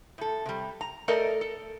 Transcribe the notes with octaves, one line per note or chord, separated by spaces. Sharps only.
A2 A4
C3 G3
A#5
A3 A4 A#4 D5 D#5
A4